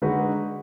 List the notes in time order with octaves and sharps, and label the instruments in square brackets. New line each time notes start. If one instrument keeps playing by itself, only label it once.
[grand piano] D3 G#3 D#4 F#4 B4